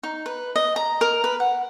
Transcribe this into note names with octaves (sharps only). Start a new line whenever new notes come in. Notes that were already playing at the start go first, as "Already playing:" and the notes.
D#4
B4
D#5
A#5
A#4
B4
F#5